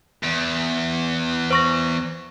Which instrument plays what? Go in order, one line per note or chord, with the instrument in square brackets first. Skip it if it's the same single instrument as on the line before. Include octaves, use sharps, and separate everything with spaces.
[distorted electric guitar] E2
[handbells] C5 C#6 A#6